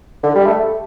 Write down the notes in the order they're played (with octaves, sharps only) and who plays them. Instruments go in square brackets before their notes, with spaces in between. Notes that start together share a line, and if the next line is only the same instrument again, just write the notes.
[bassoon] D3
G3
A3